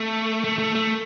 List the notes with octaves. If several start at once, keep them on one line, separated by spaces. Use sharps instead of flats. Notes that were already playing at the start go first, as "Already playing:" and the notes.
Already playing: A3
A3
A3
A3